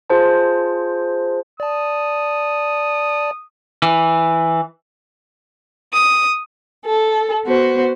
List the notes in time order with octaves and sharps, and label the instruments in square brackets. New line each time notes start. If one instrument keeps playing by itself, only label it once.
[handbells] F4 G#4 C5 A5
[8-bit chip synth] D5 A5 [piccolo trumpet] D#6
[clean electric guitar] E3
[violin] D#6
[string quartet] A4
B3 F#4 C5